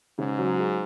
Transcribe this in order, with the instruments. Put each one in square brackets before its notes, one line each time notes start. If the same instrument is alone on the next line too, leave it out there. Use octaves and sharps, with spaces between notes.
[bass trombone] G#2 [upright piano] C#3
[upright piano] F#3
G#4